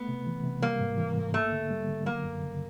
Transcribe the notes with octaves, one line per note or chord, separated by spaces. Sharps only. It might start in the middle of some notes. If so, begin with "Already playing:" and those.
Already playing: A3 B3
C3
E3
C3
G3 A#3
G#2
E3
G#2
A3 A#3
D3
G3
D3
F#3 A#3
F#2
C#3